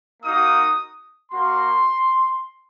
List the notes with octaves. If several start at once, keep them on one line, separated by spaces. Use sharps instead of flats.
A#3 D#4 F#4 D#6
A#3 F#4 C6